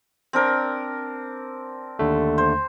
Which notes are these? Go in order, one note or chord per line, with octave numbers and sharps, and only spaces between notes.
C4 D4 A#4
D#2 D3 A3
C5